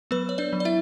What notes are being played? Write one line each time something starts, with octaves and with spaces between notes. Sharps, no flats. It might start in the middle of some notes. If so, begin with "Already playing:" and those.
F#3 B3 B4
C#5
D4 D5
F#3
D5
E4 E5